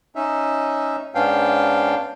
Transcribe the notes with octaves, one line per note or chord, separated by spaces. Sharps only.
C#4 D#4 E5
G#2 B3 C#4 D4 F5 G5